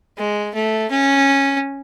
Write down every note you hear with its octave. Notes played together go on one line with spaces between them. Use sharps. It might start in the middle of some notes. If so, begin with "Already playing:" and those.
G#3
A3
C#4